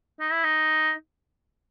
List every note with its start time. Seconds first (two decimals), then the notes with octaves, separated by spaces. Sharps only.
0.20 D#4
0.32 E4
0.44 D#4